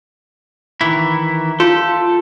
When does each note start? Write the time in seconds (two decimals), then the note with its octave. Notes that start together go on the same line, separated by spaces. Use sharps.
0.81 D#3 E3 E4
1.60 F4 A4